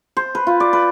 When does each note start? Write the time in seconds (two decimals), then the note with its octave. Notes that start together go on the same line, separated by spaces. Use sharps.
0.17 C5
0.35 B4
0.47 F4
0.60 D5
0.73 B4